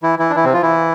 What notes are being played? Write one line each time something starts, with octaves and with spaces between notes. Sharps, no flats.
E3 E4
E3 E4
D4
E3 E4
C3 C4
F3 F4
E3 E4